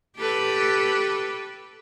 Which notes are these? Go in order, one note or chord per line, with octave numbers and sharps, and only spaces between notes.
G4 A4 B4